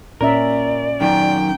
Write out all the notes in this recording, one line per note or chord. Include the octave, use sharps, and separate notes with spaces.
A#2 C#4 A#4 D5 E5
F#2 D#3 G5